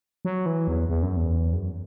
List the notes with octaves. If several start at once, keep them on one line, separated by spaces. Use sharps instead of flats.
F#3
E3
E2
E2
F#2
E2
F#2